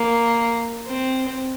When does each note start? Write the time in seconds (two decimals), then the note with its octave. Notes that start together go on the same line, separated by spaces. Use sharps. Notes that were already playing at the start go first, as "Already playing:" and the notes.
Already playing: A#3
0.88 C4